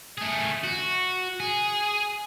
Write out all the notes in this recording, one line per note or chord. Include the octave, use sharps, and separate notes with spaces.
A3 G#4
F#4
G#4